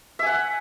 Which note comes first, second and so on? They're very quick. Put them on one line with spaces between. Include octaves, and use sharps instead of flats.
E5 G#5 F#5